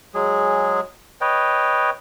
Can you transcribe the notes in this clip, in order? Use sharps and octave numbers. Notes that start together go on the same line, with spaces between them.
F#3 G#3 G#4
B4 C#5 D#5 G5